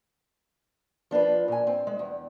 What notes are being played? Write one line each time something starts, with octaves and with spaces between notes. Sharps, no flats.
F3 D4 F4 B4
A#2 G#5
C4
G#3
E2